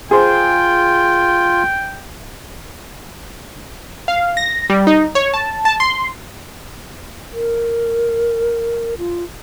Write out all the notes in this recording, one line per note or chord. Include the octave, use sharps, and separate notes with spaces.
F4 G#4 C5 G5
F5
A#6
G3
D#4
C#5
A5
A5
C6
A#4
F4